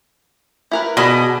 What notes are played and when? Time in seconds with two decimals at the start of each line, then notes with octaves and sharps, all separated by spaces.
0.71 E4 A#4 B4
0.97 B2 G#4 D5 B5